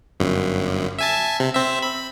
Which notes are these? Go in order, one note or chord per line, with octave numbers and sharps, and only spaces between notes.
G1 F#2
E5 G#5 A5
C3
C4 E5
B5